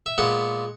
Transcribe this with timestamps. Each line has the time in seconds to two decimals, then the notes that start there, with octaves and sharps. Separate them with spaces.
0.06 E5
0.18 A#2 G#3 B3 F#5